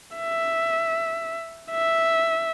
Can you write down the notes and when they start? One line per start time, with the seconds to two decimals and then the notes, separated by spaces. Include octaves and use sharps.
0.17 E5
1.71 E5